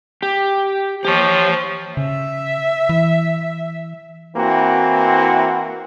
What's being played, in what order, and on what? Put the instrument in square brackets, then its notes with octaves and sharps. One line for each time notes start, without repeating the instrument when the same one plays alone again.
[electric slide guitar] G4
[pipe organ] F3 [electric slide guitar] G4 C#5
[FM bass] C#3 [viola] E5
[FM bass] E3
[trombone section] E3 A#3 C4 E4 F#4